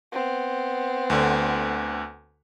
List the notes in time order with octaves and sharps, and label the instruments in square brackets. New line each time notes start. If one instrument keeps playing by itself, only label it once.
[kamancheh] B3 C4
[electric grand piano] D2 D3